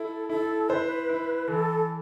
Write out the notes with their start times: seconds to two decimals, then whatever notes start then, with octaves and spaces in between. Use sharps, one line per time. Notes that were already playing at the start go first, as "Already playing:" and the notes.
Already playing: E4 A4
0.29 E4 A4
0.69 B4 C5
1.09 E4
1.48 E3 A4